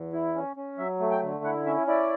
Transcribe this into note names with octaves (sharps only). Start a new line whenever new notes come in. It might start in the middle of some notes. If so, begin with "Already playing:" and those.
Already playing: E2
E4
C#4
C#4
F#3 E5
A3
G5
D3
E4 F#5
C#4 E5
E4 D5